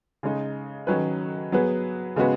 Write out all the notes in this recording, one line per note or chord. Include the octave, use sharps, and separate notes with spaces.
C#3 G#3 D#4
D#3 F#3 C#4 B4
F#3 B3 G#4 B4
C#3 G#3 B3 F#4 B4